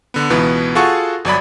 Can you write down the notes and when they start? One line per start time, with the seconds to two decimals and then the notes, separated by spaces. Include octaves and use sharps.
0.14 D3 B3
0.30 C#2 B2 E3 B3
0.75 F4 F#4 G#4 A4 F#5 C#6
1.25 G1 F#3 D5 B5